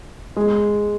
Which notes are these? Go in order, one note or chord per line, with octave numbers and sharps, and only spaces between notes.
G#3